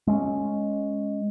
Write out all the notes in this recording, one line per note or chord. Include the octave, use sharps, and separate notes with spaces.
G#3 C#4